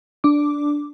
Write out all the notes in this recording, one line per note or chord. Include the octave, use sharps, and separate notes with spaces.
D4 D6